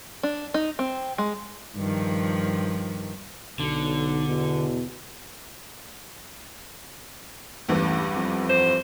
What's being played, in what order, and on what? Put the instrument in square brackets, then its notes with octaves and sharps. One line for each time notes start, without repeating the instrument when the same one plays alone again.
[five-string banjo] D4
D#4
C4
G#3
[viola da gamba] G2 D#3 F3
[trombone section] B1 [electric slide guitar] D3
[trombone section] E2 B2
[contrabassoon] A1 [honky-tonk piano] E2 G2 E3
[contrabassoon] F2
[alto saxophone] C5